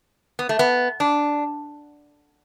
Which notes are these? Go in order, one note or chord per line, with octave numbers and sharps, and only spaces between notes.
B3
A3
B3
D4